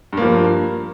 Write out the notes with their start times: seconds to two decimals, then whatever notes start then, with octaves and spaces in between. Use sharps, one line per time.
0.13 G2
0.17 A#3
0.22 F3